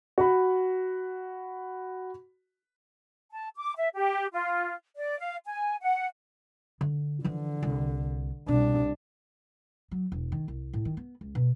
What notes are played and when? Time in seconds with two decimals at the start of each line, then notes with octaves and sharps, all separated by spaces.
0.18 F#4 B5
3.31 A5
3.57 D6
3.77 E5
3.94 G4
4.32 F4
4.96 D5
5.19 F5
5.46 G#5
5.81 F#5
6.81 D3
7.24 D3 E3 F3
7.63 C2
8.48 C2 B2 D4
9.91 F#3
10.12 E1
10.32 D#3
10.48 C2
10.73 A2
10.85 D#3
10.97 B3
11.21 C#2
11.35 B2